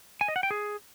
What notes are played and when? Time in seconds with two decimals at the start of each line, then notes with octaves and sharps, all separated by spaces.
0.21 G#5
0.28 D#5
0.36 F#5
0.43 G5
0.51 G#4